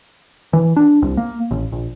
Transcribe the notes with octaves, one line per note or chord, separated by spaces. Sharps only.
E3
D4
C2
A#3
A1
A#1